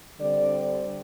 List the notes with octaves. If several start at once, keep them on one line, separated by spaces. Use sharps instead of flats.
D3 G3 C4 D5